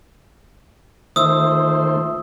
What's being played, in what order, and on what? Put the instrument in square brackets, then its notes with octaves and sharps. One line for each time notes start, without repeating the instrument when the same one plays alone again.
[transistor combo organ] D#3 A3 C5 [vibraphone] F4 E5 [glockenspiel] D#6 E6